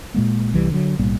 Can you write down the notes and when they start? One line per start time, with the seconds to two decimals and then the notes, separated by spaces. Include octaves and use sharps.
0.14 A#2 G#3 A#3
0.53 C2 E3 G3
0.71 D3 F#3
0.99 B1 A2 G3 A#3